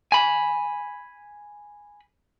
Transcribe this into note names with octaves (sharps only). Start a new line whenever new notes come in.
G#5 B5